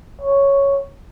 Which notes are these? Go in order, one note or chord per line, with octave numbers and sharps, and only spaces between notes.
C#5